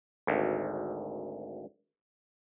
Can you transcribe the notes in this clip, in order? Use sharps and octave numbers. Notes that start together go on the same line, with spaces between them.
G#1 D2